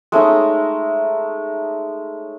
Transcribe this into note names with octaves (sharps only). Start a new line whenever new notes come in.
G#3 A3 C#4 D#4